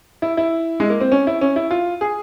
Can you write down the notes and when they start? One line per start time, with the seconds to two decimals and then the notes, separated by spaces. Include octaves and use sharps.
0.22 E4
0.37 E4
0.80 G#3
0.90 A#3
1.01 C4
1.12 C#4
1.27 E4
1.41 C#4
1.56 E4
1.71 F4
2.01 G#4